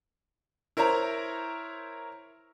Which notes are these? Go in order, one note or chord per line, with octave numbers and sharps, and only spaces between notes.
E4 A#4 C5 C#5 A#5